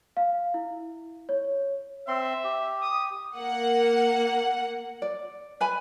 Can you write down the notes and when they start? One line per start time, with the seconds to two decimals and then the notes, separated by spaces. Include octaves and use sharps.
0.17 F5
0.54 E4
1.29 C#5
2.08 C4 E5 C6
2.44 G4
2.82 D#6
3.37 A#3 F#5
5.02 D5
5.60 B4 G#5 B5